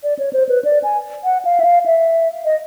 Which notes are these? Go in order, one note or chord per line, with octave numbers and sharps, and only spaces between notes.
D5
C#5
C5
B4
D5
G#5
F#5
F5
E5
F5
E5
D#5